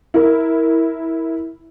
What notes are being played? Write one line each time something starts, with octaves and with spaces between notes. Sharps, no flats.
E4 A#4